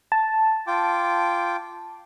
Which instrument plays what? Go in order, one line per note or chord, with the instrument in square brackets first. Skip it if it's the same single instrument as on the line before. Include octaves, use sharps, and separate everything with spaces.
[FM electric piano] A5
[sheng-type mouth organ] F4 G5 D6